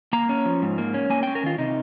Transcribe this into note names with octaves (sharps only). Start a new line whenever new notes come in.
A#3 A#5
C#4
F3
G#2
A#3
C#4
A#3 G#5
C#4 G5
A#4
D#3 F4
C3 D#4